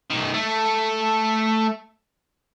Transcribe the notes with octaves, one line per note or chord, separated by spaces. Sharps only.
B1 D#3
A3